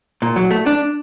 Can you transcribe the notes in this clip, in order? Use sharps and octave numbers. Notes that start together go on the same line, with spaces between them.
A#2
F#3
A3
D4